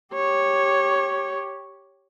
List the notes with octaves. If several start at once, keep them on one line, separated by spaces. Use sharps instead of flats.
G4 C#5